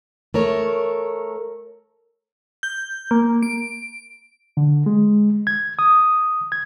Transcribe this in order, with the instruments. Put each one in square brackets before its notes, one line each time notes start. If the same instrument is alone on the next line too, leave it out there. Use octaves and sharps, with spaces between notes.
[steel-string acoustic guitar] A3 A#4 C#5
[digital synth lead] G6
A#3
D7
[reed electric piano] D3
G#3
G#6
D#6
G#6